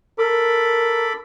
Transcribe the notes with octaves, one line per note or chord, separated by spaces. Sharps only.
A4 A#4 B5 D6